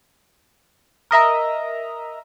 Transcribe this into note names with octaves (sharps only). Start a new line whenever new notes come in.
A#4 D#5 E5 A#5